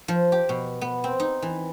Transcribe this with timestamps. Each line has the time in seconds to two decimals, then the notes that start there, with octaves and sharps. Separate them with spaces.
0.08 F3
0.32 G4
0.49 B2
0.81 B3
1.04 C4
1.20 D#4
1.42 E3